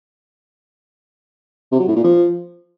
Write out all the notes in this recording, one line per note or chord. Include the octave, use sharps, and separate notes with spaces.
C3
F#3
A2
A#2
F3